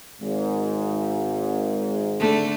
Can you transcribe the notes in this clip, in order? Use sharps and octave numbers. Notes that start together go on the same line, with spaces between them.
G#1 G#2
D3 A3